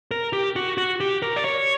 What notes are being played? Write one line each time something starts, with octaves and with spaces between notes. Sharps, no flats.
A#4
G4
F#4
F#4
G4
A#4
D5
C#5